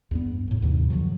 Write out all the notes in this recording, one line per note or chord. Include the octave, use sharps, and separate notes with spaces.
E2 G2 B3
F2 A2
D#2 G#2 C3 E3
F#2 D3 F3 F#3